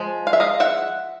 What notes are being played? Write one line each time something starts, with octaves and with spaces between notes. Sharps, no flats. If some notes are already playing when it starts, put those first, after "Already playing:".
Already playing: F3 G#3
F5
E5
D#5 F5
E5 F#5